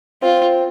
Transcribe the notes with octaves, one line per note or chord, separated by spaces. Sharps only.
C4 F4